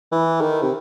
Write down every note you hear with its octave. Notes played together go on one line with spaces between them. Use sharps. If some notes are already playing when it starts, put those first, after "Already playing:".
E3
D#3
C3